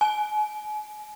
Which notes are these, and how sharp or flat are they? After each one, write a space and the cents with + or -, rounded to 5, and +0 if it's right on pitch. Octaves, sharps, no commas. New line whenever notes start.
G#5 +35